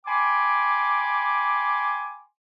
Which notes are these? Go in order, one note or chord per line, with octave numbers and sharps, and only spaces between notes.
G5 G#5 B5 C6 D6